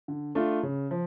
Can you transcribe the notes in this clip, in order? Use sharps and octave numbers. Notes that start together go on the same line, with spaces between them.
D3
A3 D4 F4
C#3
F3